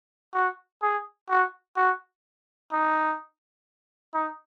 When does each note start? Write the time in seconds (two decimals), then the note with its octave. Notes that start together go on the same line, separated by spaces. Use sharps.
0.34 F#4
0.82 G#4
1.30 F#4
1.77 F#4
2.72 D#4
4.14 D#4